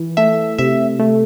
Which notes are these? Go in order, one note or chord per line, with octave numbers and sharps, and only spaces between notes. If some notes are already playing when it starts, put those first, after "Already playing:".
Already playing: E3
A3 E5
C3 E5
A3